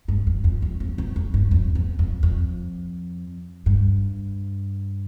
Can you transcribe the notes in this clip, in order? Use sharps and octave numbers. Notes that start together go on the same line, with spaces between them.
G2
F2
F2
F2
F2
E2
F2
G2
F2
E2
F2
F2
G2